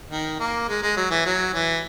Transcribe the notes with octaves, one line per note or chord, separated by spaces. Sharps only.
D#3
A#3
G#3
G#3
F#3
E3
F#3
E3